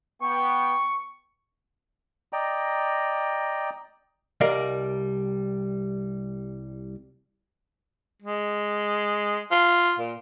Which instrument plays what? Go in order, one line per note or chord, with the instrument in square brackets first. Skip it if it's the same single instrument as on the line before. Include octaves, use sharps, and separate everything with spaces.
[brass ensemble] B3 G5 [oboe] C#6
[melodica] D5 D#5 G5 A#5
[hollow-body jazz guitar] C2 G3 A#4 D5 D#5 F5
[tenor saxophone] G#3
F4
A#2